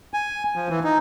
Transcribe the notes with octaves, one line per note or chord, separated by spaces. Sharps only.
G#5
F3
E3
D#4